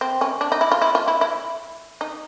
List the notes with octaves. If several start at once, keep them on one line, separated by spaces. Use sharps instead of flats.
C4
C#4
D4
D#4
E4
F4
E4
F4
E4
E4
D#4